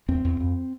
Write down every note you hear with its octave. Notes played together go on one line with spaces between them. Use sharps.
E2 C4
E2
F2